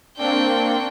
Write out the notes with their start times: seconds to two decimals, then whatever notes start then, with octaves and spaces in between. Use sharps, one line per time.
0.17 A#3 C4 D4 G5 C#6